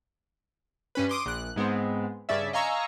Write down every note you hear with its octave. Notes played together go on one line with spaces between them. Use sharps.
G2 C#4 B4
C6 D6 D#6
A#1 F#6
G#2 G#3 B3 C4
G2 C#3 C#4 D5 E5
D#5 F5 G#5 A#5 C#6 E6